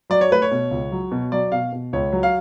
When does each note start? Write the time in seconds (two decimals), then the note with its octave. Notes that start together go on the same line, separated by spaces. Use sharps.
0.10 F#3 D5
0.21 C#5
0.30 A3 B4
0.42 C#5
0.51 B2
0.71 C#2
0.92 F#3
1.12 B2
1.32 F#3 D5
1.52 B2 F5
1.72 B2
1.93 C#2 C#5
2.12 F#3
2.23 F5